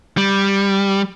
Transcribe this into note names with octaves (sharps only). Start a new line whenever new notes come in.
G3